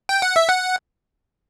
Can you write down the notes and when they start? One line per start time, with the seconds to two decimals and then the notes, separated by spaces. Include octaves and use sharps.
0.09 G5
0.22 F#5
0.36 E5
0.49 F#5